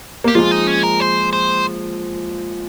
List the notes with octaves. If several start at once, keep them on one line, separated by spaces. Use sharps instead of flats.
A#3 G4
F3 G#3 F4
D#4
C#4
A#4
C5
C5